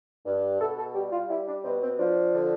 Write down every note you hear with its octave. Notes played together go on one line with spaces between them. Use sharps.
G2
B2 A4
A4
G3 G4
F4
G3 E4
D4
B2 C4
C4
F3 D4
D3